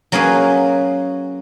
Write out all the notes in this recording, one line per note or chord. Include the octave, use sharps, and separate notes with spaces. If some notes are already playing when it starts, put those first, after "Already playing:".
F#3 A#3 C#4 G#4 B4 F5